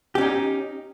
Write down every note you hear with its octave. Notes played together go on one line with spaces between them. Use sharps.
C#4 D#4 G4